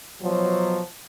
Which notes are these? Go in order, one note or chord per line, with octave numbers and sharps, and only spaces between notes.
B2 F3 F#3